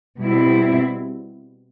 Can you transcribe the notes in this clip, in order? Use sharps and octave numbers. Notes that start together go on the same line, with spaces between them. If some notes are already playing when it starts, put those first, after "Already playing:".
B2 G3 C4 E4